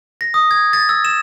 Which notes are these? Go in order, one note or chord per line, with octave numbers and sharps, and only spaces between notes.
A#6
D#6
G#6
A6
E6
E7